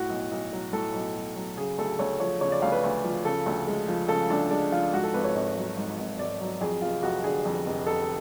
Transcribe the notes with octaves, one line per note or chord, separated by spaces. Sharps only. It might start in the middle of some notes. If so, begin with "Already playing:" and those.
Already playing: A2 F#4
B1
B1
F#3
A2 A4
B1
B1
F#3
C#3 G#4
D2 A4
D2 C#5
F3 C#5
C#3 C#5
D5
D2 F5
B4
D2
F3
C#3 A4
D2
G#3
F3
C#3 A4
D2 D4
G#3 D4
F3 F4
G#2 F#4
A4
G#1 B4
C#5
G#1
F#3
G#2
G#1
G#1 D5
F#3
F2 G#4
F1 F4
F1 F#4
D3 G#4
F2
F1
F1 A4